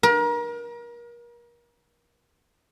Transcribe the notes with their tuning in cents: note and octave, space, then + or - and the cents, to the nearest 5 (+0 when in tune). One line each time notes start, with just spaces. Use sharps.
A#4 +35